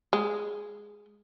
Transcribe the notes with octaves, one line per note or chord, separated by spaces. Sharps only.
G#3